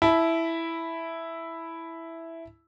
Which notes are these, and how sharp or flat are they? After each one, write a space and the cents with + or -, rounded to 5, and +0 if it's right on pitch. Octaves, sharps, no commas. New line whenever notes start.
E4 +0 A5 -20